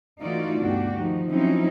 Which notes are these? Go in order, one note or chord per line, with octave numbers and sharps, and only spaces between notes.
E3 A3 D#4 F4 F#4 D5
D2 G2 B2 D4 F#4 G4
D#3 F3 D#4
F3 F#3 C4 C#4 D#4 E4